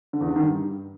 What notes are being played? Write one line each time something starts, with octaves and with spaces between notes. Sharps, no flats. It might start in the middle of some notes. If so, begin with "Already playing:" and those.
D3
E2
D3
D#3
G2